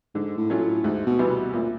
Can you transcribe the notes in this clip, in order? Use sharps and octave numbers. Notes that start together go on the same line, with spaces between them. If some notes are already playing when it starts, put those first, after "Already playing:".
G#2 D3
A2
F#3 A3 C#4 F4
A2
D2 G#2
B2
C3 E3 G3 B3
B2
D2 A#2